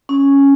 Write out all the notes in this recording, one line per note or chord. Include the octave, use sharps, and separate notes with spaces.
C#4